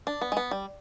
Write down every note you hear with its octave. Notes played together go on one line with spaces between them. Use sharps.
D4
B3
G#3
B3
G3